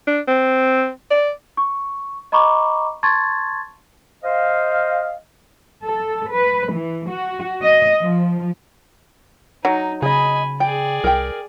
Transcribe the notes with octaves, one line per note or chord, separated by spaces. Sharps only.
D4
C4
D5
C#6
D#5 A#5 B5 C#6 D6
A5 C6 C#6 G#6 A6
C5 D#5 F5
A4
B4
E3
F#4
D#5
F3
F#3 D#4
C#3 G#4 D#5 G#5 B5
G#4 D5 G5
C2 A#4 G5